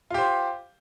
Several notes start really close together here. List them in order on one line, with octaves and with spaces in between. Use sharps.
F4 G4 C5